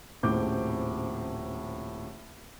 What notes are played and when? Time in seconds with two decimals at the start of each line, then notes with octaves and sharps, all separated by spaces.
0.23 D#1 A2 C#3 C4 D6 G6